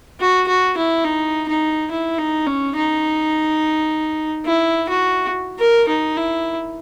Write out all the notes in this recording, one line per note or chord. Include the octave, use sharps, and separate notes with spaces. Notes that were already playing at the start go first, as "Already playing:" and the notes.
F#4
F#4
E4
D#4
D#4
E4
D#4
C#4
D#4
E4
F#4
A#4
D#4
E4